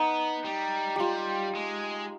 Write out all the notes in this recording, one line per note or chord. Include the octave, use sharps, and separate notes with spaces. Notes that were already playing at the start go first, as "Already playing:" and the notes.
Already playing: B3 D#4
G3
G3 F4 G4
G#3